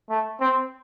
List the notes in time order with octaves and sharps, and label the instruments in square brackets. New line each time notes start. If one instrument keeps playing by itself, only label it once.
[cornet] A3
C4